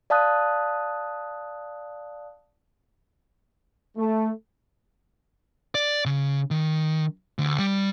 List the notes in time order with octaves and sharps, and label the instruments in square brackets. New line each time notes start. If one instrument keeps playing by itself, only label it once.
[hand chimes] D5 F5 A5 D#6 F#6
[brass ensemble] A3
[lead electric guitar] D5
C#3
D#3
D2
G3